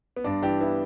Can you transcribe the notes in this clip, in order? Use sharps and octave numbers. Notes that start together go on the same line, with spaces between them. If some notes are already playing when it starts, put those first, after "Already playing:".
B3
G2 D4
E3 D4 G4
B3 E4